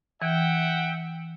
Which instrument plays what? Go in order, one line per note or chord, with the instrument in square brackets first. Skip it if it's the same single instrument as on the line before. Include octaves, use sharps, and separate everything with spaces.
[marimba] E3 [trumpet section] E5 F#5 G5